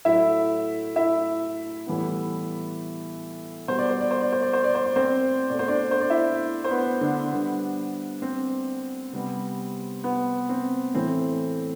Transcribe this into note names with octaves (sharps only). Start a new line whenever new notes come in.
A2 F#3 A3 E4 E5
E4 E5
A2 E3 G3 B3
B2 G3 B3 C5
D5
C5
D5
C5
D5
C5
D5
C5
D5
C5
D5
C4 C5
B2 A3 D5
C5
D4 D5
C5
D5
E4 E5
C5
B3 B4
D3 D4
D3 G3 B3
C4
C3 G3 B3
B3
C4
A2 E3 A3 C4